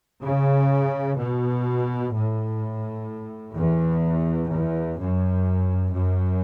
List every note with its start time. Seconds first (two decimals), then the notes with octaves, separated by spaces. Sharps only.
0.22 C#3
1.18 B2
2.13 A2
3.55 E2
4.51 E2
4.98 F#2
5.93 F#2